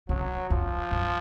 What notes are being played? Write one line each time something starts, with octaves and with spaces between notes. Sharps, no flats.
C#3 F#3
F2 F3
F#2